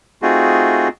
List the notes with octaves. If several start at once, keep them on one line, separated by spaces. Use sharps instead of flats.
A3 C4 D#4 F4 F#4 G#4